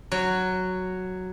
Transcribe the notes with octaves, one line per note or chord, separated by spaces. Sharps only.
F#3